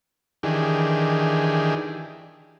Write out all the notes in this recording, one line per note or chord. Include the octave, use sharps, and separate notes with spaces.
D#3 E3 D4 G4 G#4